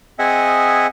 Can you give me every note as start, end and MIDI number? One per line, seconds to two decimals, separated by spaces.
0.19 0.87 60
0.19 0.87 68
0.19 0.87 75
0.19 0.87 76
0.19 0.87 78
0.19 0.87 80